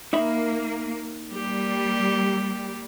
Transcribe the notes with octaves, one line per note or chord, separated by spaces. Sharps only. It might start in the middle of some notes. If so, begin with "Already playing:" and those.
A#3 D#4 E5 B5
G3 A#3 G4